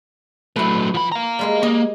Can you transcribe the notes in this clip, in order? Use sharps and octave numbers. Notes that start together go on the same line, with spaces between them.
F#3 A3 E4 B4
F3 B5
F5 A#5
G3 G#3 A#3
A#3 D#5